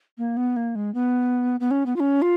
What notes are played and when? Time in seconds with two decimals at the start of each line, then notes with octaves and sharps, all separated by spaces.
0.18 A#3
0.37 B3
0.56 A#3
0.75 G#3
0.94 B3
1.60 B3
1.71 C#4
1.86 B3
1.96 F4
2.00 C#4
2.22 F4